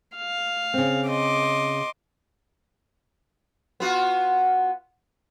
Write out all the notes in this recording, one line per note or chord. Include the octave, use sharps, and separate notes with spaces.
F5
C#3 C4
D#5 C6 D6
B3 F4 F#4